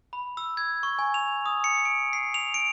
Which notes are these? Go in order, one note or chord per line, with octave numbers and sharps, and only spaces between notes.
B5
E6
G#6
C#6
G#5
F7
D#6
C#7
D7
C7
F7
D7